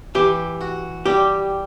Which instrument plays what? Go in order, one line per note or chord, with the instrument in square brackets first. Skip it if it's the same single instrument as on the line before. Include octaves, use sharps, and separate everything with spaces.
[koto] E3 [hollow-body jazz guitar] G4
[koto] F#4
[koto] G3 [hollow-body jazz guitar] G4